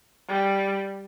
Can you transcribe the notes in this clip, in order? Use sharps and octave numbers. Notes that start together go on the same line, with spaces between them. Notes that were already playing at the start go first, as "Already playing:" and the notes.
G3